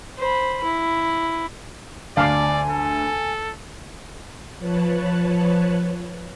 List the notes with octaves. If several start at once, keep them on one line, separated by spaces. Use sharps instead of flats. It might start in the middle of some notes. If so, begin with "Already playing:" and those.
C5 B5
E4
D2 D5 F5 G#5 A5 D6 C7
A4
F3 B4 C#5 A5 F#6